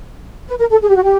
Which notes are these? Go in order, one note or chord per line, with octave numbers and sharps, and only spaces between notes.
B4
A#4
A4
G#4
G4
F#4
G4